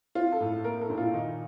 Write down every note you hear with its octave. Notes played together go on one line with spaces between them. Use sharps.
C4 F4
A4
A2
A#3 A#4
A4
A#2
F4
D#3 D#4